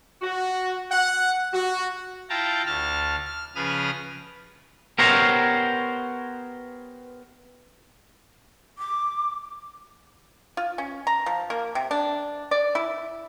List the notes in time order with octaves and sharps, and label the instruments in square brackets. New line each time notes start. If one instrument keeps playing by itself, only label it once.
[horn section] F#4
F#5
F#4
[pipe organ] E4 F4 F5 G5 A5 A#5
D2 A5 F6
F6
C#3 F3 G#4 B4 D#6 F6
[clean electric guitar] B3 G4 A#4 C5 C#5 A#5
[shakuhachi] D6
[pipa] F4
C#4
A#5
F3
A#3
C3
D4
D5
E4